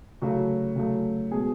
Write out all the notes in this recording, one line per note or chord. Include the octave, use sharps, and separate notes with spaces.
C#3 F#3 A3 F#4
C#3 F#3 A3
B2 G#3 G#4